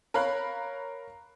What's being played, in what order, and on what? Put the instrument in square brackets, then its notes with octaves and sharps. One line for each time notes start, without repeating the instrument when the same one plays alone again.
[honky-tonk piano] A#4 C#5 F5 B5 F#6